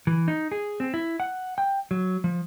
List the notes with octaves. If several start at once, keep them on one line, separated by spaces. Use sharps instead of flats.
E3
D#4
G#4
C4
E4
F#5
G5
F#3
F3